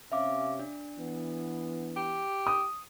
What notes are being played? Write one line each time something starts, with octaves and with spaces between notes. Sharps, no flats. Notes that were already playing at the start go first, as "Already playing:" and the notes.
C3 C#4 E5 F5 D6
D4
E3 B3
G4
D#6